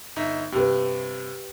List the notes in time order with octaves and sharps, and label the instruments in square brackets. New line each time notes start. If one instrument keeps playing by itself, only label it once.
[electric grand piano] G1 D#4 E5
[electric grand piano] G2 C3 [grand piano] G4 B4